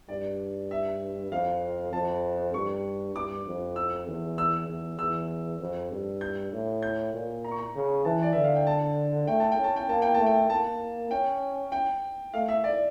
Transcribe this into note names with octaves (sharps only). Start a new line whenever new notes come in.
G2 D5
E5
F2 F5
F2 A5
G2 C#6
G2 D6
F2
E6
E2
E6
E2
E2 E6
F2
G2
G6
A2
G6
A#2
A#5
C#6
A#5
C#3
E3 A5
D5
D3 E5
F5
G5
A5
A3 G5
A5
G5
C#4
A5
G5
A#3 A5
G5
A3 A5
G5
A#3 A5
C#4 G5
G5
A3 F5
E5
D5